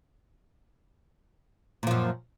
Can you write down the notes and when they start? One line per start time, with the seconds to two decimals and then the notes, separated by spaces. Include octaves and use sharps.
1.83 A#2
1.87 F3
1.91 F#2